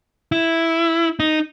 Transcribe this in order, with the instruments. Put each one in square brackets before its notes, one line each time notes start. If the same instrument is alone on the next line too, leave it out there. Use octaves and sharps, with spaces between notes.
[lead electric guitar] E4
D#4